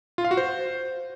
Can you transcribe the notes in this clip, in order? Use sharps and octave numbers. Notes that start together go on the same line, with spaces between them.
F4
F5
F#4
C5